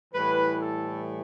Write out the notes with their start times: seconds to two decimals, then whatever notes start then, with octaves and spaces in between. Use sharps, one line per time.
0.14 A2 E3 G3 B4
0.61 A4